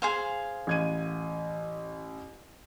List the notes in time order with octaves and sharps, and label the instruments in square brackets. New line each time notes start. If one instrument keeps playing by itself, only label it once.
[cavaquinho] G#4 C5 F5
[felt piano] A1 G#6 D#7